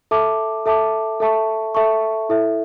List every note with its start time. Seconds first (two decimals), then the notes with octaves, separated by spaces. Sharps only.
0.11 A4 E5 A5 D6
0.66 A4 E5 A5 D6
1.20 A4 E5 A5 C#6
1.75 A4 E5 A5 C#6
2.29 E4 A4 E5